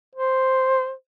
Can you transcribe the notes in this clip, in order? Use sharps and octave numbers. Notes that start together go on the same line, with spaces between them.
C5